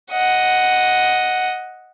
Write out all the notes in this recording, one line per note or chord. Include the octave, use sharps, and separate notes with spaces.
D#5 F#5